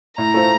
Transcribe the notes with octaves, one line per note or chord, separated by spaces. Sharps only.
A2 A#5
F3 A3